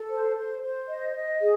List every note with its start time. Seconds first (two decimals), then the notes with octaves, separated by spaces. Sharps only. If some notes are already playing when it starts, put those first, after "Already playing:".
Already playing: A4
0.10 C5
0.36 C5
0.62 C5
0.88 D#5
1.14 D#5
1.40 G#4